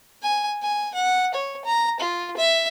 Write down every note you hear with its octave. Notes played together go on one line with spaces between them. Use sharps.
G#5
G#5
F#5
C#5
A#5
F4
E5